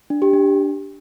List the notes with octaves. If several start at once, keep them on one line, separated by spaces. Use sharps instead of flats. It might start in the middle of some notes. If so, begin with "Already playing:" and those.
D4
G4
D4